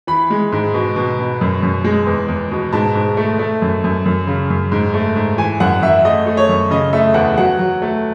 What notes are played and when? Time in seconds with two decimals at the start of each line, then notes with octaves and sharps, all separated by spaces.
0.07 E3 B5
0.30 G#3
0.52 G#2
0.74 B2
0.96 B2
1.19 B2
1.41 F#2
1.62 F#2
1.84 G#3
2.07 E2
2.28 E2
2.52 B2
2.73 G#2 A5
2.95 G#2
3.17 A3
3.39 A3
3.62 F#2
3.84 F#2
4.05 F#2
4.27 C#3
4.50 F#2
4.72 G#2
4.94 A3
5.16 G#2
5.38 E3 G#5
5.60 F#2 F#5
5.82 F#2 E5
6.05 A3 D#5
6.26 A3
6.37 C#5
6.49 F#2
6.71 C#3 D#5
6.93 A3 E5
7.14 E2 F#5
7.38 F#3 F#5
7.59 F#3
7.82 A3